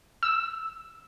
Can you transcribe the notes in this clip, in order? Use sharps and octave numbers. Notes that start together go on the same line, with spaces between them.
E6